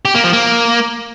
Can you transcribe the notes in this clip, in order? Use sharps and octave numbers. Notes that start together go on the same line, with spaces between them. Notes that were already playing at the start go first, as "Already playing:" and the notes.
G4
A#3
F3
A#3